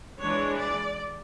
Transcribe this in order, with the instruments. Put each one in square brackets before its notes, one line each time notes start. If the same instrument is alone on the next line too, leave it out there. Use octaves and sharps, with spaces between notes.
[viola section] E3 G#3 D4 C#5
D5